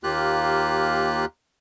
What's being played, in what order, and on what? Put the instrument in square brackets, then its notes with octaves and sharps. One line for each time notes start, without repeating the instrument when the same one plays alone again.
[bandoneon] D#2 A#3 F4 G4 F#6